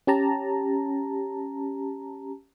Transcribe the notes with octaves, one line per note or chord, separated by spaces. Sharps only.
C#4 G4 A5 A#5